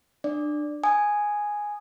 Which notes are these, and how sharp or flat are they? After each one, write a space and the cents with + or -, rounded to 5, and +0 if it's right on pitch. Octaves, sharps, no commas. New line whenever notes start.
D4 +25 D5 +0
G#5 +0 D#6 -15